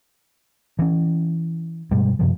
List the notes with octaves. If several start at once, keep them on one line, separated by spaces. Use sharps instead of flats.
E3 C#4
G2 B2 G3 G#3
F#2 C3 F3